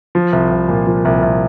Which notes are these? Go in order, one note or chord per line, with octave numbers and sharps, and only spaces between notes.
F3
C2
C2
A#2
F3
C2
C2